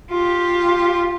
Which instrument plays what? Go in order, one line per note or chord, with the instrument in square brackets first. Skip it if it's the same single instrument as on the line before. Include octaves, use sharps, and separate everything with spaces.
[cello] F4 G4